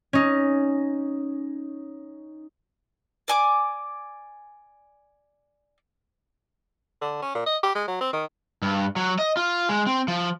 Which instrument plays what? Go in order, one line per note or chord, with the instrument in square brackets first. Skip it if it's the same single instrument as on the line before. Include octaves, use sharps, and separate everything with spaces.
[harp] C#4 D#4
[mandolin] D5 G#5 D6
[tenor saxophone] D3
C#4
A#2
D#5
G4
G#3
F#3
C4
D#3
[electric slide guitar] G2
F#3
D#5
F4
G#3
C4
F3